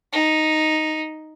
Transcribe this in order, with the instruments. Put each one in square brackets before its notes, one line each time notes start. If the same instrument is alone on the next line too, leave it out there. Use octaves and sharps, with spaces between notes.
[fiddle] D#4